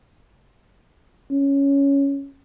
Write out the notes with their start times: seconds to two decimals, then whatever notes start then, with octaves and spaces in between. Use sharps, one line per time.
1.31 C#4